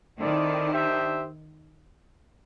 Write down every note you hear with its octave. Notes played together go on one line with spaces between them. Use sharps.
D#3 C4 E4 A4 D5
D4 G4 C5 E5